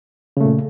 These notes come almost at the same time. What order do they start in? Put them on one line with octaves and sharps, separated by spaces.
C#3 A3 A#2